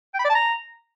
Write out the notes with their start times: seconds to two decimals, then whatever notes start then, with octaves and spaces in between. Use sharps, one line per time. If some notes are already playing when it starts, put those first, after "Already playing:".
0.14 G5
0.19 B5
0.25 D5
0.30 A5
0.35 A#5